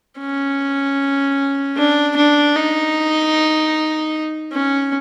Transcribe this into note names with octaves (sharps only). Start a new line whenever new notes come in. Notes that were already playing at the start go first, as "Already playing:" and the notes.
C#4
D4
D4
D#4
C#4